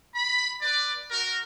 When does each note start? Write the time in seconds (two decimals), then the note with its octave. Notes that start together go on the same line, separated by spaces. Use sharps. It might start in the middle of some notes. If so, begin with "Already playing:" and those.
0.15 B5
0.62 B4 D5
1.11 F#4 A#4